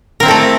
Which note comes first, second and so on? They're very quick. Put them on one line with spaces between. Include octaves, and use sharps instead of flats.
A#4 C4 E4 A4 A3